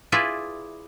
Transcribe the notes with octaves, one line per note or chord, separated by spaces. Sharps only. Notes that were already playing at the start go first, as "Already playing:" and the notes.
E4 F4 G#4 B4 D5 E5